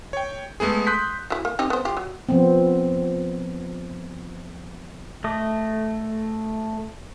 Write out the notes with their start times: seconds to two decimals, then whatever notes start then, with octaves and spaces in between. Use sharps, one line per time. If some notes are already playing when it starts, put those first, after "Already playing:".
0.13 C#5 G5
0.60 G#3 A3 B3 G#4
0.87 C6 D#6 F#6 G6 B6
1.30 F#3 E4
1.45 A#3
1.59 C4 D#4 G4
1.70 B3 C5
1.85 F4 G4
1.97 F#3
2.29 F3 B3 C4
5.24 A3 D#5